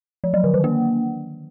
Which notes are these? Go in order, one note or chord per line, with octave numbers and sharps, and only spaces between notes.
F3
F#3
D3
D#3
A#3